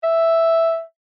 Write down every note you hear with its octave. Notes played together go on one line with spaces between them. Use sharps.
E5